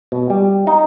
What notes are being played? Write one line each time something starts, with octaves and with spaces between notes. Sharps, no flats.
B2
G3
D#4